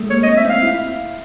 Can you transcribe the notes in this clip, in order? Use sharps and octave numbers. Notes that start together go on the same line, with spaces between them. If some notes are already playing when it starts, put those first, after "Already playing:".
Already playing: G#3 A3
A#3 C#5
D#5
C4
E5
C4
F5
E4